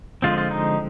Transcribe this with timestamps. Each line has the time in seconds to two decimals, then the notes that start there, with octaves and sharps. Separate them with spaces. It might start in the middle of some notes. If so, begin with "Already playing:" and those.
0.22 D3 F3 G#3 C4 F4
0.38 F4
0.51 D#4